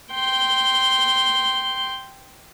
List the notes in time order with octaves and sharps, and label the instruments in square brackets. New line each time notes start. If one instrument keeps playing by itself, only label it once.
[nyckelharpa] G5 C6